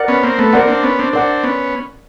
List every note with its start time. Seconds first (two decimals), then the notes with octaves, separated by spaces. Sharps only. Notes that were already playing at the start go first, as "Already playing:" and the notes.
Already playing: A#4 D5 F#5
0.08 B3 C#4
0.23 A#3 C4
0.38 A3 B3
0.53 A#3 C4 A#4 D5 F#5
0.68 C4 D4
0.83 B3 C#4
0.99 C4 D4
1.13 C4 D4 A#4 D5 F#5
1.43 B3 C#4